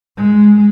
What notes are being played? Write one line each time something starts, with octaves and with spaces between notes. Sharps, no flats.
G#3